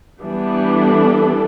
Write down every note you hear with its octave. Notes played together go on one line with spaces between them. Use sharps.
E3 G3 B3 D4
A4